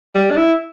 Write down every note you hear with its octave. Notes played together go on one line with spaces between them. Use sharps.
G3
D4
E4